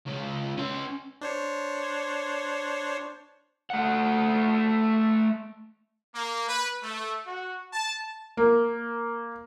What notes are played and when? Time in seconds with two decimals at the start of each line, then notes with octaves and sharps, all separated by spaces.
0.06 C#2 C#4
0.57 C#4 C6
1.21 D4 C5 C#5
3.70 A3 F#5
6.15 A#3
6.49 B4
6.82 A3
7.26 F#4
7.73 A5
8.37 A#3